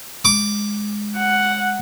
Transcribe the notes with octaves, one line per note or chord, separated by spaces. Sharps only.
G#3 D6
F#5